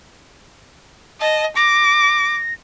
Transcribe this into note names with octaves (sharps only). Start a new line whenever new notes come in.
D#5 A5
D6 A#6